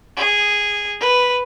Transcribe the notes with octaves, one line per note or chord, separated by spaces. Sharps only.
G#4
B4